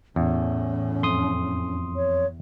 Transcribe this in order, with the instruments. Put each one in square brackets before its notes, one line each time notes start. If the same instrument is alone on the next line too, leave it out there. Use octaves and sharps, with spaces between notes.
[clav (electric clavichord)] E2 [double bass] A2 [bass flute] C#4
[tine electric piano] F2 C6 D#6
[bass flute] C#5